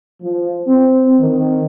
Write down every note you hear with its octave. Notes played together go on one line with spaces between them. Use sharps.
F3
C4
D#3